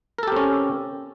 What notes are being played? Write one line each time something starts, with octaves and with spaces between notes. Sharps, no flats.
C4 C#4 G4 A4 A#4